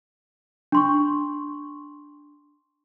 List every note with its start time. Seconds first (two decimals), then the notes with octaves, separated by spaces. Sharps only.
0.72 D4 C6 C#6